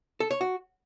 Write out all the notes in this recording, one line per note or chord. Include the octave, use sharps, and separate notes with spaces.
A4
C#5
F#4